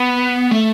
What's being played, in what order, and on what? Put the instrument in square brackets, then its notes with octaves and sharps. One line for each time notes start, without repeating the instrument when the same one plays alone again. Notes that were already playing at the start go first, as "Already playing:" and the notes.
Already playing: [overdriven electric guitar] B3
A3